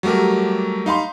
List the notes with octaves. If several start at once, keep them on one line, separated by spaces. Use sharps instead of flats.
F#3 G3 A3 G4 A#4
D#4 F5 B5 C6